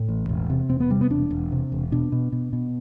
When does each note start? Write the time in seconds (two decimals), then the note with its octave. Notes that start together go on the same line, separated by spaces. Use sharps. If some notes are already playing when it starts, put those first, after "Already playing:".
Already playing: A2
0.09 A1
0.29 E1
0.50 C3
0.69 E1 C4
0.80 B3
0.90 C3 G3
1.01 B3
1.10 E1 D4
1.30 E1
1.52 C3
1.72 E1
1.92 B2 D4
2.12 B2
2.32 B2
2.53 B2